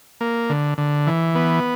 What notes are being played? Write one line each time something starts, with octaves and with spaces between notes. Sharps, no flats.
A#3
D3
D3
E3
B3